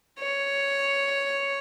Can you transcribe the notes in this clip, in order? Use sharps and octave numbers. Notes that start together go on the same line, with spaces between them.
C#5